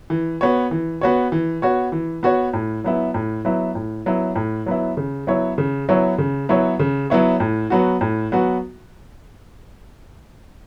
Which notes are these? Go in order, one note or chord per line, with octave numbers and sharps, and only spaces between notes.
E3
B3 F#4 C#5
E3
B3 F#4 C#5
E3
B3 F#4 C#5
E3
B3 F#4 C#5
A2
F#3 B3 E4
A2
F#3 B3 E4
A2
F#3 B3 E4
A2
F#3 B3 E4
C#3
F#3 B3 E4 C#5
C#3
F#3 B3 E4 C#5
C#3
F#3 B3 E4 C#5
C#3
F#3 B3 E4 C#5
A2
F#3 B3 F#4
A2
F#3 B3 F#4